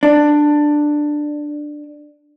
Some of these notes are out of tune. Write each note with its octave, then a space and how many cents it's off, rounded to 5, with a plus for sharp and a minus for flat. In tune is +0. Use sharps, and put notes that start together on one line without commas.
D4 +10